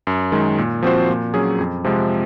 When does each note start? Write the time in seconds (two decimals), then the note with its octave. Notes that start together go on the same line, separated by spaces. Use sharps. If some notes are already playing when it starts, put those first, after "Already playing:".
0.07 F#2
0.32 D#3 G#3
0.58 A#2
0.82 F3 C4 F#4 C5
1.09 A#2
1.34 F#3 C#4 G#4
1.58 F2
1.84 C3 F3 G#3